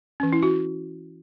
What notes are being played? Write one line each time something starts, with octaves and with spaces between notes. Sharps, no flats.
E3 C#4
E4
F#4